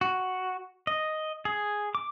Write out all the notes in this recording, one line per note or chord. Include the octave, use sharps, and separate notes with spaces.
F#4
D#5
G#4
D6